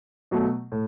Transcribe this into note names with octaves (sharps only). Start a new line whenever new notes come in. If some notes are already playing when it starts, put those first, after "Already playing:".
B2 F#3 A3
A2